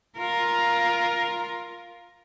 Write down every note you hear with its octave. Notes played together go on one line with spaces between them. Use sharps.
F4 A#4